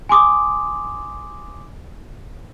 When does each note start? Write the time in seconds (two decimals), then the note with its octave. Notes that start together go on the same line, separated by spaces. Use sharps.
0.09 G#5 C6 D6 D#6